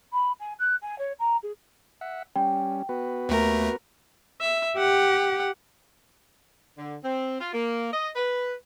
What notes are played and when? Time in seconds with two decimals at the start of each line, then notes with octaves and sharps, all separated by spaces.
0.13 B5
0.39 G#5
0.59 F#6
0.82 G#5
0.98 C#5
1.19 A#5
1.43 G#4
2.01 E5 F#5
2.36 G3 C#4 G5
2.89 B3 F#4 B4
3.29 D#2 A3 A#4
4.41 E5
4.78 G4 F#5
6.78 D3
7.04 C4
7.40 F4
7.54 A#3
7.92 D#5
8.16 B4